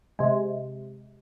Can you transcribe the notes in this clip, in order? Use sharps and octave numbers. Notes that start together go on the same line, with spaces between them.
C3 G#3